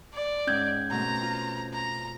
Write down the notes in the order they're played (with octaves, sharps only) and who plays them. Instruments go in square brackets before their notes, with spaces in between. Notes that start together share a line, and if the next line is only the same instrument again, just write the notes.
[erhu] D5
[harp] G#2 E6 [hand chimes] C#4 G6 G#6
[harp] B2 A3 C4 [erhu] A#5
[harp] F4
[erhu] A#5